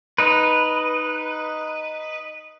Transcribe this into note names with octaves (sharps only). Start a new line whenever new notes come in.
D#4 B4